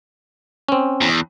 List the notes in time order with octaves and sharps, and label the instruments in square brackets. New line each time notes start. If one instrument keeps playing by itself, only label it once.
[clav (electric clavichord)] C4 C#4
[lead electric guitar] E2